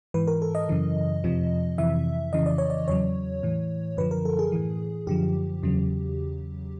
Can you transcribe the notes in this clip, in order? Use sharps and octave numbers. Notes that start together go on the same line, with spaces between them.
G#2 E3 B4
A#4
A4
D#5
F#2 C#3 E3
F2 C3 F3
F2 C3 E3 E5
F2 C#3 E3 D#5
D5
C#5
D5
E2 C#3 F#3 C#5
A2 E3
F#2 D3 F3 B4
A#4
A4
G#4
A2 E3
F#2 D3 F3 G4
E2 C#3 F#3